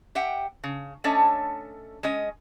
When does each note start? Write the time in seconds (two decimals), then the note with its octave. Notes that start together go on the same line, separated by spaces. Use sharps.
0.15 G4 E5 F#5 G5
0.64 C#3
1.04 A3 C#4 D4 A4 C#5 D#5
2.03 G#3 C#4 D#5